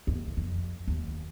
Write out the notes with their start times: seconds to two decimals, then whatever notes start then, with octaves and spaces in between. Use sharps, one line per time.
0.07 D#2
0.37 F2
0.87 D#2